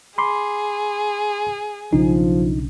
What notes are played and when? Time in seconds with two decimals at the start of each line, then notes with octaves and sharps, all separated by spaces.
0.18 G#4 B5 C6 D6
1.93 B1 C#3 F3 D4 D#4